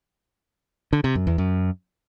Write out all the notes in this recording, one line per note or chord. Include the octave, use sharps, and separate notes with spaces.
D3
C3
F#2
E2
F#2